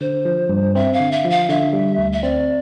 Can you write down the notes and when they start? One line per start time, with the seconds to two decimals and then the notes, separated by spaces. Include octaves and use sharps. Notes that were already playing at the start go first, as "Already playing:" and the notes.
0.01 D3 C5
0.25 F3
0.49 G2
0.75 C4 E5
0.93 F5
1.00 D3
1.12 E5
1.25 F3
1.30 F5
1.49 D3 E5
1.73 G3
1.98 D2
2.12 E5
2.23 C4 D5